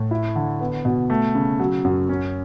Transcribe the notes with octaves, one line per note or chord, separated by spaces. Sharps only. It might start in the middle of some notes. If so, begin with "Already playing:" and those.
Already playing: A2
E4
D3
B3
B2
A3
C#3
F#3
F#2
C#4